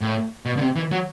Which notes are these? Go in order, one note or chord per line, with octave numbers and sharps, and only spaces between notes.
A2
B2
D3
C3
E3
F#3